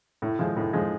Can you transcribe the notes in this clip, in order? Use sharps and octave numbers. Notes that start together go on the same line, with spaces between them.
A2
F3 G#3
A2
F3 G#3